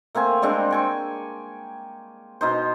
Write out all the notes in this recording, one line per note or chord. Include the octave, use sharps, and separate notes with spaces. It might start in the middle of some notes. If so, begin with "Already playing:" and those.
A3 A#3 C4 G#5
G3 G#3 C4 D4
G5 G#5 C#6
B2 D#4 C5